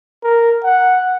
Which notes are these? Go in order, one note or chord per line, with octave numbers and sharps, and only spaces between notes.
A#4
F#5